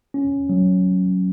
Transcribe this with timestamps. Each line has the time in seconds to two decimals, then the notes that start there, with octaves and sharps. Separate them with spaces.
0.14 C#4
0.49 F#3